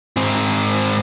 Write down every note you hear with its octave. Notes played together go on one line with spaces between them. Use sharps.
G#2 C4